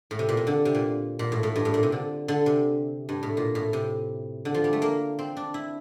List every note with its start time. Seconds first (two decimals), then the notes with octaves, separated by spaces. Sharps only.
0.11 A2
0.19 C3
0.29 A#2
0.37 C3
0.47 D3
0.65 C3
0.75 A#2
1.19 A#2
1.32 A2
1.43 A2
1.56 G2
1.65 A2
1.74 A#2
1.83 C3
1.92 D3
2.28 D3
2.46 C3
3.09 G2
3.23 A2
3.37 A#2
3.55 A2
3.73 C3
4.45 D3
4.54 F3
4.64 G3
4.73 A3
4.82 A#3
5.19 C4
5.37 D4
5.54 E4